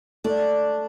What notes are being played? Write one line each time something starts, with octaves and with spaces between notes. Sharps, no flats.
A3 D4